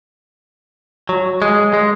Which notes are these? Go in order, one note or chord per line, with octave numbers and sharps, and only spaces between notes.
F#3
G#3
G#3